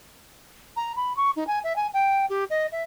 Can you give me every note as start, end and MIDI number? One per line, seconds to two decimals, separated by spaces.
0.76 0.92 82
0.96 1.15 83
1.16 1.30 85
1.36 1.47 63
1.47 1.59 80
1.64 1.75 76
1.76 1.87 80
1.93 2.26 79
2.29 2.44 67
2.50 2.67 75
2.72 2.83 76